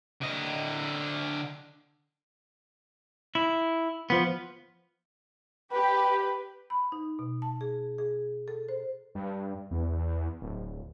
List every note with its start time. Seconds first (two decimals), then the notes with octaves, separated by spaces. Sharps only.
0.21 D3 D#5
3.35 E4
4.10 F3 B3
5.72 G4 B4
6.70 B5
6.92 D#4
7.19 B2
7.42 A5
7.61 G#4
7.98 G#4
8.48 A4
8.69 C5
9.15 G2
9.71 E2
10.42 D1